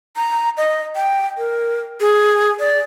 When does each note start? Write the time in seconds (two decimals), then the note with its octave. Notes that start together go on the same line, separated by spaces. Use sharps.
0.16 A#5
0.57 D#5
0.96 G5
1.38 A#4
2.01 G#4
2.60 D5